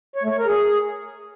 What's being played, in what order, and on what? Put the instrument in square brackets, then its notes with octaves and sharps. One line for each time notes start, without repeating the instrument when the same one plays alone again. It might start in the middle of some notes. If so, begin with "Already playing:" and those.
[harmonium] C#5
A3
C#5
A#4
G#4